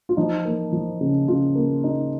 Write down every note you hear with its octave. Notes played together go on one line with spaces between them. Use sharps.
F4
F3 D#4
A#3
F3
C#3
C#3 F4
A#3
D#4